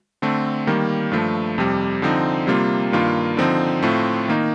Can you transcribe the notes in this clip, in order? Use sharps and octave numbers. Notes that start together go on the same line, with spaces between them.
D3 A3 C4
D#3 G3 A#3
G2 F3 A3
F2 C3 G3
D3 F3 C4 D#4
C3 G3 A#3 F4
G2 D#3 A#3 F4
D3 F3 C4 D#4
A2 A3 C4 F4
D#3 A#3 D#4